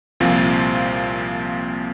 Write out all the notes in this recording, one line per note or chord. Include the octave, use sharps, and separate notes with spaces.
C2 A#2 F3 C4 F4